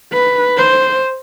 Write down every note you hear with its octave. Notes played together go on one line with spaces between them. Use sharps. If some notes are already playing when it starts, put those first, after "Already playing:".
B4
C5